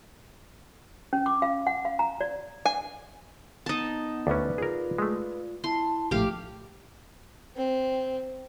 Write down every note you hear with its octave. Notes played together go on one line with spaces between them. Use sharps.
C#4
D6
F5
F#5
F5
A#5
D5
G#5
B3 D#4 A5
D2 C#4 B4 D5
F4 G#4 A#4
G#3 A3
E4 A5 C6
A#1 A2 A3 G4 F5
C4